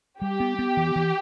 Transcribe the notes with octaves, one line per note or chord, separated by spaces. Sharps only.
G3 G4
B3
B3
E3
E3